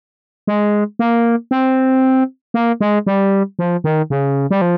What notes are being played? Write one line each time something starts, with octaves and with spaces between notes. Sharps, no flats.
G#3
A#3
C4
A#3
G#3
G3
F3
D#3
C#3
G3
F3